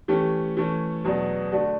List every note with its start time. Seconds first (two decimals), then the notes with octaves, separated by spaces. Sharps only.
0.08 E3 A3 C#4 G4
0.57 E3 A3 C#4
1.04 E2 B2 F#3 B3 D4
1.52 D3 A3 D4 F#4